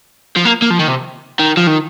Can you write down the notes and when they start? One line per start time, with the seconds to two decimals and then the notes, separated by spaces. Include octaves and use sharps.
0.36 F3
0.45 A#3
0.62 A#3
0.71 F3
0.79 D#3
0.88 C3
1.40 D#3
1.57 F3
1.67 D#3